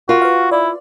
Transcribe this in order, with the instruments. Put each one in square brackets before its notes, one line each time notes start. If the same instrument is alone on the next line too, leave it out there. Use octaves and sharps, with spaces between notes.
[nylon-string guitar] F4 [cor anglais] F#4 [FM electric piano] A#4 F5
[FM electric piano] B4 F5
[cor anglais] E4 [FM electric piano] D5